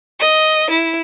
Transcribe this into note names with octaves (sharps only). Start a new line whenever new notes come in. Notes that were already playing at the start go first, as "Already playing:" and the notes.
D#5
E4